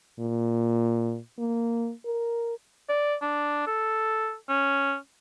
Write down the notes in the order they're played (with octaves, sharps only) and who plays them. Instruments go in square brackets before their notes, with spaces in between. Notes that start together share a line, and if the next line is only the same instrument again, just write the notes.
[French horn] A#2
A#3
A#4
[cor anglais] D5
D4
A4
C#4